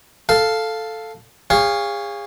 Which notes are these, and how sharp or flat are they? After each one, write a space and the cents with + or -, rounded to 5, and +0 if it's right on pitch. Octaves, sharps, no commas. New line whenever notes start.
A4 +0 F5 +0
G#4 -35 C#5 +10 F5 +0